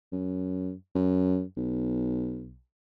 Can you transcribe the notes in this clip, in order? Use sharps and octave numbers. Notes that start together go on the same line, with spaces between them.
F#2
F#2
B1